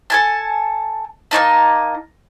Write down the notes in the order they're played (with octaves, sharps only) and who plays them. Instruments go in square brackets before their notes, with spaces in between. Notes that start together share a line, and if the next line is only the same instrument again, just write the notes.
[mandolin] A4 G#5 A5
A#3 C#4 D#4 A5